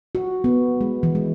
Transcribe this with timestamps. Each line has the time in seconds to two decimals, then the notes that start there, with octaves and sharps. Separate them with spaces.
0.15 F#4
0.44 B3
0.81 G#3
1.03 E3
1.15 G#3